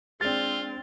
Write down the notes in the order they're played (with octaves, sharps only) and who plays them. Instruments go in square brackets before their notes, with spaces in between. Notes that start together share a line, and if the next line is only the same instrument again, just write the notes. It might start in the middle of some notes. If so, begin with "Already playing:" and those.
[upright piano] G#3 D4 [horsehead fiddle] C4 [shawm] F4 [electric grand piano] A6